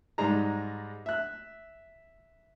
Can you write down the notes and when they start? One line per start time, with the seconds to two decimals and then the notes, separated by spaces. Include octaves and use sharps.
0.18 G#2 G3 G#3 A#5
1.06 E5 F#6